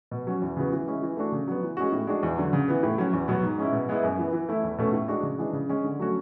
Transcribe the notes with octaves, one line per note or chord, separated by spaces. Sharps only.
B2
F#3 C#4 F#4
E2
C#3 E3 B3 F#4
E3
G#3 C#4 E4
E3
A3 D4 F#4
C#3
F#3 B3
E3
G#3 C#4 F#4
A2
G#3 D4 F#4
E2
D3 F#3
C#3
E3 B3
A2
F#3 C#4
E2
B2 F#3 B3
G#2
G#3 C#4 E4
B2
G#3 B3 E4
F#2
E3 B3
E3
A3 E4
E2
B2 A3 C#4
A2
G#3 D4 F#4
C#3
E3 G#3 D4
C#3
G#3 C#4
D3
F#3 A3 C#4 F#4